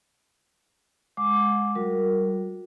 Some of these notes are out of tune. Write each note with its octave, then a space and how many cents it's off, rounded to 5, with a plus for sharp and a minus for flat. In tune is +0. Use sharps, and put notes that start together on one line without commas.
G#3 +0 F#5 -35 D6 +0
G3 -35 F#4 -35 A#4 -10